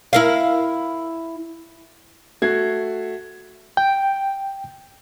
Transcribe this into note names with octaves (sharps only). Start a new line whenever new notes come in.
E4 A#4 F5
A3 F#4 G#6 C7
G5